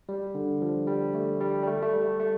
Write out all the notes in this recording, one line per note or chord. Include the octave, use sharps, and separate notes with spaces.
G3
D3
F3
G3
A3
G3
G3
A3
A3
G3
A3